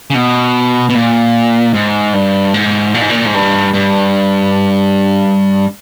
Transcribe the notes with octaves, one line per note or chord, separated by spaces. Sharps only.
C#3
B2
B2
A#2
G#2
G2
G#2
A#2
G#2
A#2
G#2
G2
G2